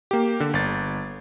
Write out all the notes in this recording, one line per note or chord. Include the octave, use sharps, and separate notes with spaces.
A#3 G4
D3
G1 A6